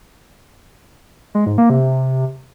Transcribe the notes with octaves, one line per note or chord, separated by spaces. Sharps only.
G#3
G#2
A#3
C3